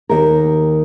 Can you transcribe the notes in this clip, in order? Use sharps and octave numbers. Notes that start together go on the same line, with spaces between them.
D#2 G4 A#4